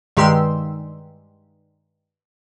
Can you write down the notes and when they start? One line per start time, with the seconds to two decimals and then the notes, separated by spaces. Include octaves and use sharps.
0.17 G2 D#3 G#3 G4 C6 E6